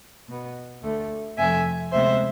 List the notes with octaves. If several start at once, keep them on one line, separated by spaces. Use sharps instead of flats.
B2 B3
D2 D3 A3
F2 C3 F3 A3 E5 G#5
D2 C3 G#3 B3 C5 E5